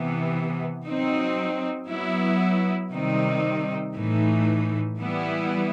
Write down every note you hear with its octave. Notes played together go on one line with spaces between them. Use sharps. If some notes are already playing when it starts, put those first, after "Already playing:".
Already playing: C3 E3 B3
F#3 C4 D#4
F#3 B3 E4
C3 D#3 G3 C4 D#4
A2 E3 A3 D#4
E3 G3 B3 E4